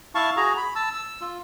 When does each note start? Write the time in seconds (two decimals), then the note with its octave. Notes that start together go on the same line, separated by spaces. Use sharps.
0.15 E4 F5 A5 C#6
0.37 F#4 G#4 A#5
0.57 B5
0.76 A5 E6
0.93 E6
1.21 F4